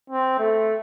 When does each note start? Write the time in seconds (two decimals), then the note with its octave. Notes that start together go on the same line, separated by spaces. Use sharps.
0.10 C4
0.39 A3